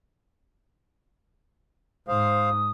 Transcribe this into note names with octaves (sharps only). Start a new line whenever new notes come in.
G#2 C5 F5 D#6